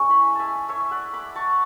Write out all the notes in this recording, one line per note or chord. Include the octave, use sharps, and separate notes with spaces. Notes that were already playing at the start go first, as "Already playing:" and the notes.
Already playing: G#3 C#4 E4 C#6
G#5 B5
E5 G#5 A5
C#5 E5
D5 F#5
B5 D6
A5 C#6